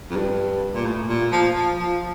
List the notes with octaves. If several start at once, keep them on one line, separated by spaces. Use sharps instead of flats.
F2
G2
A#2
A2
A#2
F3
F3
F3